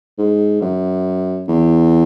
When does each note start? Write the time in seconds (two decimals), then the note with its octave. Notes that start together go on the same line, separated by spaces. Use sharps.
0.18 G#2
0.62 F#2
1.48 E2